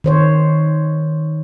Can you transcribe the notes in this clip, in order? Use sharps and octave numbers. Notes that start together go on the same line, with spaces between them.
D#3 C5 C#5